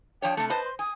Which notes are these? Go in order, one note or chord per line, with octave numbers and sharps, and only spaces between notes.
F3 D4 C#5 G5
C3 A3 A5
B4 C5 D#5 A5
C6
G#5 D#6